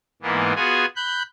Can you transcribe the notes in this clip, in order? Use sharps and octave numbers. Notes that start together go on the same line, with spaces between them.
G#2 E3 A#3 B3
B3 F4 F#4 G#4 G#5
B5 F#6 G6